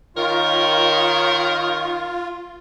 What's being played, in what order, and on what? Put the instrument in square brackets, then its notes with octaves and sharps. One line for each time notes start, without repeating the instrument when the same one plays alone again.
[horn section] D#3 A#4 C#5 [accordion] F4